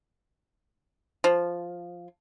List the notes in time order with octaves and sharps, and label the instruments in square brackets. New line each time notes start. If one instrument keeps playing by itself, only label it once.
[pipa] F3